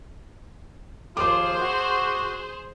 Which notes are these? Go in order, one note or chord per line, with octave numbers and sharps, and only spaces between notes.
D#2 F3 F4 G#4 C5 D6
F#4